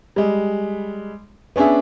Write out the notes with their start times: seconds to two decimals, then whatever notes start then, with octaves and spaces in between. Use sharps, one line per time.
0.16 G3 G#3
1.56 B3 C#4 D4 G#4 E5